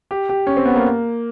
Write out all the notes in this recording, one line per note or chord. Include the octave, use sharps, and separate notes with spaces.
G4
G4
C#4
C4
B3
A#3